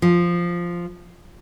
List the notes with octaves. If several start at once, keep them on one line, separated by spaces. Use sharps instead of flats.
F3